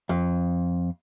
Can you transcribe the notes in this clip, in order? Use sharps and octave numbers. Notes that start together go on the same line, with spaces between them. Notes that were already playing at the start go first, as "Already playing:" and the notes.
F2